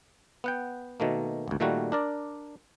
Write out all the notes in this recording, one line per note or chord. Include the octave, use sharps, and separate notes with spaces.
B3 F#5 G5
B2 D#3 A3 A#3
G#1 D2
A#2 D#3 G3 A3 A#3 F#4
D4 A#4 D5